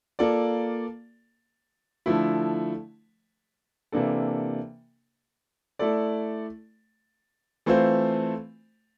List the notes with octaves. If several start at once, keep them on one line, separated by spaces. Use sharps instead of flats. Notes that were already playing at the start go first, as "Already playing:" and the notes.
A#3 F4 A4 D5
D3 F3 A3 E4
C3 E3 A#3 D4 A4
A3 E4 A4 D5
E3 A3 C4 F4 C5